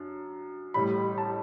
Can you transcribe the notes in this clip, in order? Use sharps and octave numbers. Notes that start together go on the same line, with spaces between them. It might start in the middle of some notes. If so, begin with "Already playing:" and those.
Already playing: F#2 D4
A1 A2 G3 B5
A5